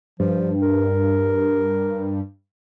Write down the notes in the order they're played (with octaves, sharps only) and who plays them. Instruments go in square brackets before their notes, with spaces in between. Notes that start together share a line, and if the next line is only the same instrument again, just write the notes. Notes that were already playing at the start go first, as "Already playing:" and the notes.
[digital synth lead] G2 [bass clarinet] F3
[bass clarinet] A#4